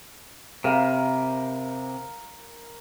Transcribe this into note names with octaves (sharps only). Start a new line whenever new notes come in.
C3 A#4 F5 B5